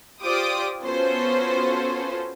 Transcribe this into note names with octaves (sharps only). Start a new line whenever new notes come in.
F4 G4 C5 D5 D6 D#6
B3 C#4 F4 F#4 A4 C5